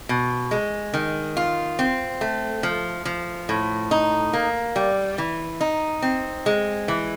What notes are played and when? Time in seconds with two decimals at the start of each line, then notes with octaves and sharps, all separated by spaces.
0.09 B2
0.51 G#3
0.94 D#3
1.37 F4
1.79 C4
2.21 A3
2.63 F3
3.05 F3
3.49 A2
3.91 D#4
4.33 A#3
4.76 G3
5.18 E3
5.61 D#4
6.02 C4
6.46 G#3
6.88 E3